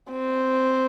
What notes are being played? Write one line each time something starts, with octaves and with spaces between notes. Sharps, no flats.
C4